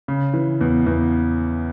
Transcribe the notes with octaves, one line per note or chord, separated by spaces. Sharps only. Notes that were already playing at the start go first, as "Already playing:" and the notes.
C#3
E3
E2
E2